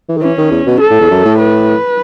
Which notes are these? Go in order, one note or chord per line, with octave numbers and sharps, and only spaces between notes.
E3
D#3
E3 C#4
D#3
E2
B2
A4
A2
E2
F#2
A2
B4